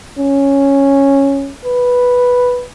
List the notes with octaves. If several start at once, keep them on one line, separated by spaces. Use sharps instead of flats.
C#4
B4